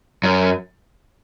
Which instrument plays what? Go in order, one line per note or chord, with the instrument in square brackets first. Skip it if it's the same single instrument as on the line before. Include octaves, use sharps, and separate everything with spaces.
[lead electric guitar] F#2